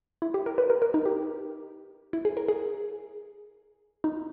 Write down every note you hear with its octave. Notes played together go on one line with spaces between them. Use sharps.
E4
G4
A#4
B4
A#4
A#4
D#4
G4
E4
G#4
A#4
G#4
D#4